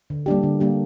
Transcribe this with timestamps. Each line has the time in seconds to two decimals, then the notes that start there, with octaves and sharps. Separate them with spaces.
0.10 D3
0.26 G3 A#3 D4 G4
0.43 D3
0.60 G3 A#3 D4 G4